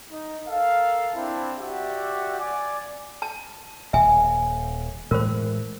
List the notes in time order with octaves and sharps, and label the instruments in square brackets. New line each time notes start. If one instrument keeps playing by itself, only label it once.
[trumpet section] D#4
A4 A#4 F5
C4 D4 E4
F#4 G4 D5 E5 F#5
D5 G#5 D6
[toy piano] A5
[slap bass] D#1 [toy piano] E5 G#5
[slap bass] A2 E3 G#3 [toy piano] A#4 C5